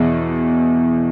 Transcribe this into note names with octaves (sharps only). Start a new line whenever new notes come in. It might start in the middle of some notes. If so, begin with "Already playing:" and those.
Already playing: E2 B2 E4 G#4